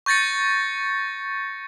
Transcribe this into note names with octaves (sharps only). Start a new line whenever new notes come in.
C#6 G6 A6 A#6 C#7